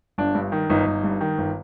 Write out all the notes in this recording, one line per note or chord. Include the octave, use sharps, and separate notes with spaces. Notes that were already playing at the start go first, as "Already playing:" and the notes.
G1 D4
G2
D#3
G1 D#4
G1
G2
D#3
G1